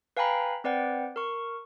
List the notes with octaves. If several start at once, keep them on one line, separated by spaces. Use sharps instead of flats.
B4 F5 G5 G#5 A#5 B5
C4 B4 D5 F#5 G5
A#4 C#6